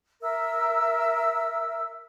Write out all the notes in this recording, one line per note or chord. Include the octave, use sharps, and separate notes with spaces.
A#4 E5 E6